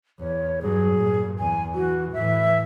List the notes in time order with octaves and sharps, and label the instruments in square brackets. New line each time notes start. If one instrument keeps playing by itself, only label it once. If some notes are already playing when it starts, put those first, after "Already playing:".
[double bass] E2 [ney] C#5
[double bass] G2 F#3 [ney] G#4
[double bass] G2 A#2
[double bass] E2 [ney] G#5
[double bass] E3 [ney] F#4
[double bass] A2 E3 [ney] E5